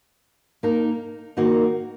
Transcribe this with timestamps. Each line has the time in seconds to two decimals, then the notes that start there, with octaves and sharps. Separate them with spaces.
0.63 A#3 D#4 A#4
1.37 D#3 A#3 D#4 F#4